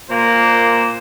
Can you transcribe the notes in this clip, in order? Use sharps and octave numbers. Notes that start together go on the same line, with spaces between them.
A#2 A#3 C5